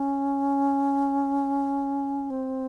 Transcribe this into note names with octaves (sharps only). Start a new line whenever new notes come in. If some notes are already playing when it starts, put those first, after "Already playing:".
Already playing: C#4
C4